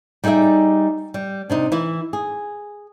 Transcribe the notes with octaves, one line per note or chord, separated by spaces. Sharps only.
G3 D#4 G#4 D5 E5
G3
C3 D4 D#4
E3 E4
G#4